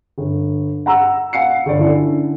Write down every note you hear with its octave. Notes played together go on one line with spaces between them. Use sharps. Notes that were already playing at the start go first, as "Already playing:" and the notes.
G1
F#5 A#5 E6
F5 F#5 C7 C#7
G1 D5
D3 C#4 E4 A4